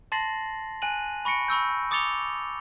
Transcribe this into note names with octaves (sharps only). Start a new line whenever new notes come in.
A5 C6 A6 A#6 C7 F#7
G#5 F#6 D#7 F#7
B5 C#6 A#6 C#7 D7
B5 C#6 E6 G6
D6 D#6 A6 C#7 F7 G7